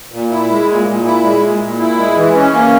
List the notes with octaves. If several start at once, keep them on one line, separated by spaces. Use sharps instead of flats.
A#2
E4
G#3
A#2
A#2
E4
G#3
A#2
A#2
E4
G#3
E3
C#4
A#3